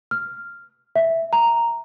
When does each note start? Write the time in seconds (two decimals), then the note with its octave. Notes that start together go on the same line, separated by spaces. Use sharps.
0.11 F6
0.96 E5
1.33 A#5